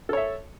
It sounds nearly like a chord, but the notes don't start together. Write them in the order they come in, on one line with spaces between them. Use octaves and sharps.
A4 C#5 E5